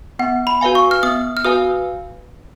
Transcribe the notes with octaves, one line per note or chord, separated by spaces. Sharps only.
B3 F#5
B5
F#4 B4 F5 G#5
C#6
F6
B3 D#6
F6
F#4 B4 F5 G#5 D#6